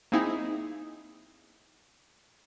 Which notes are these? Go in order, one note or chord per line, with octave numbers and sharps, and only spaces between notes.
A#3 C4 D#4 E4 G#4